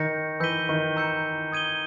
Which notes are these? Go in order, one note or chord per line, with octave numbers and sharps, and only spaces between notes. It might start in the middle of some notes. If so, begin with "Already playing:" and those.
Already playing: D#3 G6 A#6 C#7
E3 E6 G6 B6 D#7 G7
D#3
A#5 E6 G6 C#7
D#6 G#6 D#7 G7